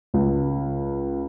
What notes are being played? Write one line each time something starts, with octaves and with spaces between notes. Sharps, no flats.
C#2